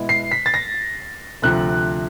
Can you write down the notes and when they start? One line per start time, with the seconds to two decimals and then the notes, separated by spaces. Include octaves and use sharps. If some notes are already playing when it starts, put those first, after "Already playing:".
Already playing: B2 G#3 B3 E4
0.09 C7
0.31 B6
0.46 A6
0.54 A#6
1.42 D2 C3 F3 F#6